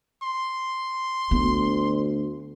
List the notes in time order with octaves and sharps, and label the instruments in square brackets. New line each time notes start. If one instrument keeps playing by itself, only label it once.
[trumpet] C6
[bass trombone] D2 [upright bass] B3